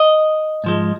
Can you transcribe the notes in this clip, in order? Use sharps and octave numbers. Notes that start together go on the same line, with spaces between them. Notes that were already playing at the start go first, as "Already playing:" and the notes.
Already playing: D#5
G#2 F3 G#3